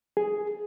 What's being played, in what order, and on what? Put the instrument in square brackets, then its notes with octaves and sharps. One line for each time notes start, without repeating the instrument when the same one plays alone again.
[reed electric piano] G#4